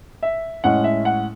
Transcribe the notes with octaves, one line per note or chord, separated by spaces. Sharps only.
E5
A2 G#3 C#4 F#5
E5
F#5